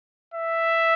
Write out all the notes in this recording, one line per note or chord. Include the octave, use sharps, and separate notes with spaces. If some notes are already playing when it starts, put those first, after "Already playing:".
E5